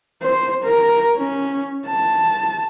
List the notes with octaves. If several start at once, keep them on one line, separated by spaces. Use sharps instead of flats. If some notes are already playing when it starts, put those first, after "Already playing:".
C5
A#4
C#4
A5